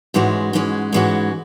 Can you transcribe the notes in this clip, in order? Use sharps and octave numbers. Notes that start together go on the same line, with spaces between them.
G#2 E3 G#3 C#4 F#4
G#2 E3 G#3 C#4 F#4
G#2 E3 G#3 C#4 F#4